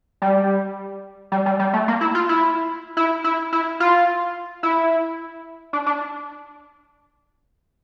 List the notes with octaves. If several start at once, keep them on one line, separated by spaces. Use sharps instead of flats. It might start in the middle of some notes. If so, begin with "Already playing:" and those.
G3
G3
G3
G3
A3
A#3
E4
F4
E4
E4
E4
E4
F4
E4
D4
D4